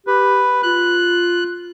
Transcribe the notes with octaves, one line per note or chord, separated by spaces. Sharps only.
G4 B4
F4 F#6